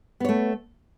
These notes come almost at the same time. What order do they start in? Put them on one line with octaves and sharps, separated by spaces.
B3 C#5 A3